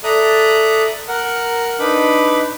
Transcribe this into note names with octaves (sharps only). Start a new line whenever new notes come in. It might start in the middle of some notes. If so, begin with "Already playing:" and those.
A4 D5 E5 A#5 D#6 F#6
A#4 F#5
D4 D#4 B4 B5 D6